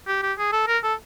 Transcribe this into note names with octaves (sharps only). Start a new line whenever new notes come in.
G4
G4
G#4
A4
A#4
A4